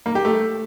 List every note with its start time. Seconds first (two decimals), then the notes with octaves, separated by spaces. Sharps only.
0.06 A#3
0.15 G4
0.25 A3